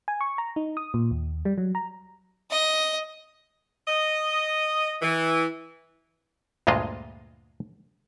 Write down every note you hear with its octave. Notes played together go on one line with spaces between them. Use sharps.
G#5
C#6
A#5
D#4
D#6
A#2
D#2
G3
F#3
A#5
D#5
D#5
E3
D2 G2 A#2 G#3 F4 D#5